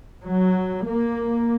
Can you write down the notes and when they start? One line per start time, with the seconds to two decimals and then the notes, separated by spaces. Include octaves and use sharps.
0.25 F#3
0.85 A#3